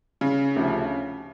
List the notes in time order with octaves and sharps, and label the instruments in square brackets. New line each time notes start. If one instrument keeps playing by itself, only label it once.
[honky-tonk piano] C#3
[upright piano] D2 C3 F3